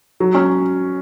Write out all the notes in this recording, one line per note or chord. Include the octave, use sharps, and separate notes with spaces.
F#3
C#4